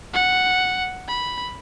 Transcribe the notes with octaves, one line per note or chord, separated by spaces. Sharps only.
F#5
B5